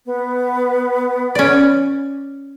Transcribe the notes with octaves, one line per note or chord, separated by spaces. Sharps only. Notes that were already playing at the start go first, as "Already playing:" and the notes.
B3
C#4 D5